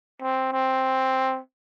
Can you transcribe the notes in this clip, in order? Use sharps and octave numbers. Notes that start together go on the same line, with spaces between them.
C4
C4